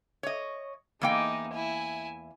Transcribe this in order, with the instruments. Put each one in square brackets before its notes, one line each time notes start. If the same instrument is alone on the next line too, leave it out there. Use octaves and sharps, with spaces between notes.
[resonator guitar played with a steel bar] C#5 D#5
[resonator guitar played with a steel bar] E2 A#3 G5 [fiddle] G#3 D#4
[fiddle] E4 G#5